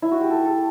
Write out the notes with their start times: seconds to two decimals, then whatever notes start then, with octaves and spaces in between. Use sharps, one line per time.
0.02 E4
0.11 F#4
0.21 G4
0.30 A4
0.45 A4